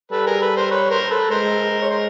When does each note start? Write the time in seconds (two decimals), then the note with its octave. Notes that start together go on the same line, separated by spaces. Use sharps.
0.11 G3 A4 B4
0.27 G#4 A#4
0.41 A4 B4
0.56 A#4 C5
0.71 B4 C#5
0.90 A#4 C5
1.11 A4 B4
1.30 G#3 A#4 C5
1.82 C#5
1.90 A#4 C5